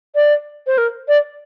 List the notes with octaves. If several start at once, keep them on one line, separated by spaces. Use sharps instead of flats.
D5
C5
A#4
D5